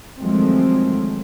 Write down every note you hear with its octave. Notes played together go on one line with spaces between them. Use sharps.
D#3 F3 F#3 G#3 A3 C4